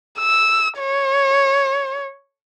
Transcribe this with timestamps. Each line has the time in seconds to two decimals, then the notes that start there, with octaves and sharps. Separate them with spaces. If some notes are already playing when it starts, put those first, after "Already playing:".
0.19 E6
0.79 C#5